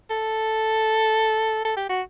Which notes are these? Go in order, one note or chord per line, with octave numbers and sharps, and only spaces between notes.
A4
A4
G4
F#4